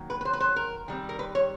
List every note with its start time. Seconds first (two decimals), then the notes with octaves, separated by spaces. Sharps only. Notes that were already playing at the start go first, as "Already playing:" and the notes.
Already playing: D#3 F#3 A#3
0.10 B4
0.21 B4
0.25 C5
0.33 B4
0.40 C5
0.56 A#4
0.88 D#3 G3 C4
1.09 A#4
1.19 B4
1.35 C#5